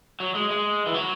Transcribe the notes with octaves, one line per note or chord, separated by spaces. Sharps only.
F#3
G#3
G#3
E3
F#3